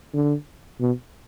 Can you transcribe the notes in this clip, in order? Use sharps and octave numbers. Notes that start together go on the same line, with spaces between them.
D3
B2